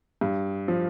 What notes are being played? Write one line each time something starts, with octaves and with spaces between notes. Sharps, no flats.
G2
F3